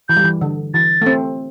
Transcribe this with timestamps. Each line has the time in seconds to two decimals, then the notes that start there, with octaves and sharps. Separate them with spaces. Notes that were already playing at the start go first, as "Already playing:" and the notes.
0.09 E3 G6
0.17 G3
0.24 E3
0.41 D3
0.74 E3 A6
1.02 A3
1.06 C4